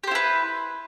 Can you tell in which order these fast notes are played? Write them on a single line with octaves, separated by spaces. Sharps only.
G4 C5 E4 B4